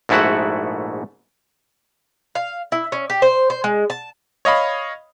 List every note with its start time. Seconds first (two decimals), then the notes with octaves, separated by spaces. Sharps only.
0.09 A#1 G#2 A3 E4 F#4 F#5
2.35 F5
2.72 E4
2.92 C#4
3.10 G4
3.22 C5
3.50 C5
3.64 G#3
3.90 A5
4.45 C#5 D#5 F5 B5